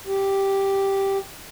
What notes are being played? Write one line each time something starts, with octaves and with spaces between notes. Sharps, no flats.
G4